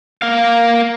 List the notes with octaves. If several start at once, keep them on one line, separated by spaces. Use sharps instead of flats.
A#3 F5